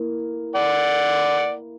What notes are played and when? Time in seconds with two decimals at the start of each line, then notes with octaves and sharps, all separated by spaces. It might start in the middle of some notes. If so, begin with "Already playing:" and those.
Already playing: A#3 E4
0.55 D5 F#5